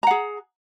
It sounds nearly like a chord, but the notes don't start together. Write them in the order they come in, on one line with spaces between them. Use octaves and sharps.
A#5 F#5 G#4